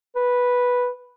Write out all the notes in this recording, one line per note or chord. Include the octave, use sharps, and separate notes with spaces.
B4